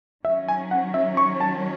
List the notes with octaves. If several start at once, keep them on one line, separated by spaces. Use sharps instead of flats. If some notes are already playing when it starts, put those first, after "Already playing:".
D#3 F#3 C#4 E5
G#5
F#5
E5
C#6
A5